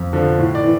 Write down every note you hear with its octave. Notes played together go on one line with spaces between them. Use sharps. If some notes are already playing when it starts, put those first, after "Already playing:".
Already playing: F2
D3 F3
A2
D5
E3